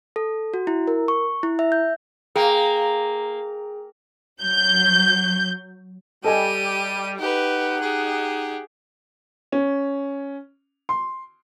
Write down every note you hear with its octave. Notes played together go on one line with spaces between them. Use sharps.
A4
F#4
E4
A#4
C#6
E4
E5
G6
A#3 G#4 G5 A#5
F#3 G6
G3 G4 A4 D#5 G#5 D#7
D#4 G4 B4 F#5
G4 G#4
C#4
C6